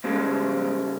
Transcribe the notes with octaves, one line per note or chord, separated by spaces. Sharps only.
G#2 C#3 G3 G#3